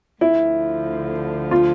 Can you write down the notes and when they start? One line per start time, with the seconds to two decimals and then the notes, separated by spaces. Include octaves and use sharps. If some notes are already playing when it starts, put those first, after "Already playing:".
0.21 D2 D3 F3 E4
1.51 F4